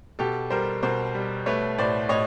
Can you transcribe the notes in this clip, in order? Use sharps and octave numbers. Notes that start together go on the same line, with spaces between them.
B2 G4 A4
G3 A#4 C5
B2 A#4 C5
G3
A3 B4 C#5
A2 C5 D5
A2 C#5 D#5